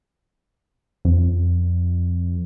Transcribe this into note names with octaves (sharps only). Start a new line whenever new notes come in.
F2